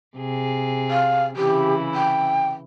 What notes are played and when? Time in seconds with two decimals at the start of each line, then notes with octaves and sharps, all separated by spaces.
0.17 C3 G#4
0.91 F5
1.37 C#3 E3 E4 G4
1.95 G5